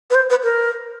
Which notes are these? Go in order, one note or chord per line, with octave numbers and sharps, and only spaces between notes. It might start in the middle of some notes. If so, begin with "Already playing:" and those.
B4
C5
B4
A#4